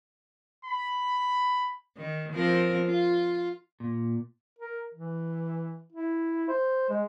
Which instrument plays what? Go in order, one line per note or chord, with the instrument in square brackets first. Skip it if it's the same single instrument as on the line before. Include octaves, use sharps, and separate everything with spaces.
[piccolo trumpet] B5
[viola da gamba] D#3
F3 C4 A#4
F4
[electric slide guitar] A#2
[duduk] A#4
E3
E4
C5
G#3